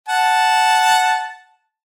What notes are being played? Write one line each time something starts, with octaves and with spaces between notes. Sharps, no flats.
F#5 A5